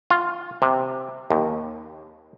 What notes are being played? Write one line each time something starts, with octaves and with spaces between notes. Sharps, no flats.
F4
C3
D#2